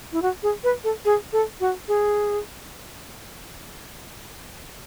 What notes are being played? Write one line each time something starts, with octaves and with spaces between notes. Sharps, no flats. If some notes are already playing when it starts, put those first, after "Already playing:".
E4
F#4
G#4
B4
A4
G#4
A4
F#4
G#4